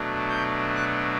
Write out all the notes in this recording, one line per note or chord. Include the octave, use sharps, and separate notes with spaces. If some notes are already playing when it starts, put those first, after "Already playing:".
Already playing: B2 F#3 A3 D4
G6
F#6